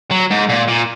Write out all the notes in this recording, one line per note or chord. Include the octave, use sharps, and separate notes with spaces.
F#3
G#2
A#2
A#2